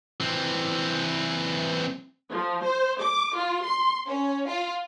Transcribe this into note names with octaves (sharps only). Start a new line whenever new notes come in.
E3 C4
F3
C5
D6
F4
C6
C#4
F4